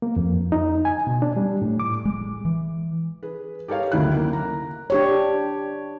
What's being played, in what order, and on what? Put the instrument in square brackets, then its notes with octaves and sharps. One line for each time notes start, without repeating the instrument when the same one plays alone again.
[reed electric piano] A#3
F2
D#4
G#5
B2
D4
G3
A2
D6
[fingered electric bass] G#3
E3
[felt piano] G#4 B4
G4 A4 A#4 C#5 F5
F#1 D2 D#3 E4 F#6
A#3
A#5
[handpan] D4 G4 C#5